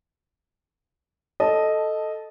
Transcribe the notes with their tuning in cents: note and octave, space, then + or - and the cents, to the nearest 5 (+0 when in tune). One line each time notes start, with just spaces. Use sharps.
A4 +0 D#5 +0 A5 -10